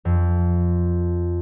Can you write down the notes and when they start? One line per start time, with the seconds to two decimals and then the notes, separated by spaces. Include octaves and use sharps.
0.05 F2